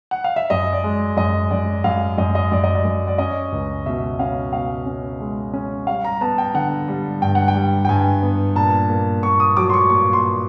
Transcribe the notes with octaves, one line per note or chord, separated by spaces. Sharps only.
F#5
F5
E5
F#2 D#5
D5
G#3
F#2 D#5
F#2 D5
F#2 F5
F#2 D#5
D#5
F#2 D5
D#5
D5
F#2
D5
C#4 D#5
C#2
B2 E5
C#4 F5
B2 F5
C#4
G#3
C#4
G3 F5
A#5
B3 A5
G5
D3 F#5
G3
G2 G5
F#5
G5
G3
G5
G2 G#5
B3
A#2 A5
A#3
A#2 C#6
D#6
F#3 D6
C6
C#6
A#2 C#6
C6